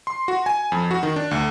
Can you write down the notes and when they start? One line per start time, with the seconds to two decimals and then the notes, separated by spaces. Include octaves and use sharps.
0.07 C6
0.28 F#4
0.46 G#5
0.72 F2
0.91 F#4
1.03 D#3
1.16 D4
1.31 D2